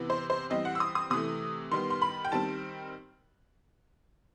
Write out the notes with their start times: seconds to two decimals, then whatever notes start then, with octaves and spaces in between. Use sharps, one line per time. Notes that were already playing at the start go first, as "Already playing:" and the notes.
Already playing: C3 E3 B3
0.10 C5
0.30 C5
0.50 E3 G3 C4 D#5
0.65 F#5
0.75 E6
0.80 D#6
0.95 D#6
1.10 C3 E3 A3 D#6
1.71 D#3 G3 B3 C6
1.90 C6
2.02 B5
2.25 G5
2.32 D#3 G3 C4 A5